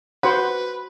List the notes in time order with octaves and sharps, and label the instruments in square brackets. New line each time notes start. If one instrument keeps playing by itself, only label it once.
[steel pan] F#4 C5 F#5 [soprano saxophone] B4